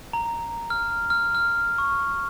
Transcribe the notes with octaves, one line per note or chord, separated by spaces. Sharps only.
A#5
F6
F6
F6
C#6